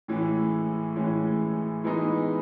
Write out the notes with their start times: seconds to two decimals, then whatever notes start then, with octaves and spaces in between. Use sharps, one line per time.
0.08 A2 E3 G#3 C#4
0.96 A2 E3 G#3 C#4
1.84 E3 G#3 B3 D#4